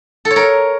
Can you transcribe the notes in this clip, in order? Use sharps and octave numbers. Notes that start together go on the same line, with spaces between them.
A4
C#5
A#4